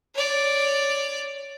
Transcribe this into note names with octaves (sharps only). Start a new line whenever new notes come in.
C#5 D5